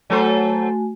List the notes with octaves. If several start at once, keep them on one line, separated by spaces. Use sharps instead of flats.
F#3 A3 F#4 A4 C5 G#5